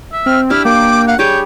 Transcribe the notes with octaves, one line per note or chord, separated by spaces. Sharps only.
E5
C4 F6
D4 E4 G4 F6
A#3 G5 D6
F5 F#5
G3 G#4 C#5 D6 G6